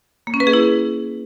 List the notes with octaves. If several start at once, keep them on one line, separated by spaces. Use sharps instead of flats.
A#3
C#4
B4
G#4
E4